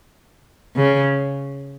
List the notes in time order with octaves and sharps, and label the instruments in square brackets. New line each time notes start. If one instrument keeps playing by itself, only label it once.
[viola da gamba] C#3